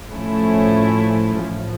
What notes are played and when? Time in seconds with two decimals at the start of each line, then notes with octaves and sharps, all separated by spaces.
0.13 A2 F3 A3 C#4 E4
1.42 A1 A2 F3